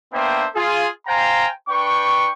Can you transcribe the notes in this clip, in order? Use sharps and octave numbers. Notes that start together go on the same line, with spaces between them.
A#3 B3 D4 C5 E5 G5
F4 G#4
C5 F5 G5 G#5 A#5
D4 B4 G5 C#6